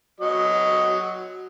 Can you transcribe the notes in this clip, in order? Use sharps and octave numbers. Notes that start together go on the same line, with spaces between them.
F#3 D#5